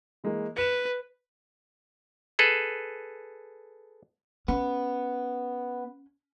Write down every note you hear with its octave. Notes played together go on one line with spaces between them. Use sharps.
E3 G#3 A#3
B4 C#7 E7
G#4 A4 B4
B3 C#4